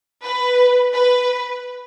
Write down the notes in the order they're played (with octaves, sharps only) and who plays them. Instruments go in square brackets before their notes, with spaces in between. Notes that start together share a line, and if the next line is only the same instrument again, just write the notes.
[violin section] B4
B4